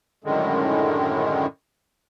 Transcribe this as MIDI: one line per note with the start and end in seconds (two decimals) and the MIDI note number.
0.24 1.46 42
0.24 1.46 45
0.24 1.46 50
0.24 1.46 51
0.24 1.46 56